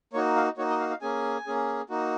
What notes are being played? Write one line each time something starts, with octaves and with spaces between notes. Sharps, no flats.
A#3 D#4 F#4 C#5
F5
A#3 D#4 F#4 C#5
D#5
F5
F5
A#3 C#4 G#4 G#5
A#3 C#4 G#4
A#3 D#4 F#4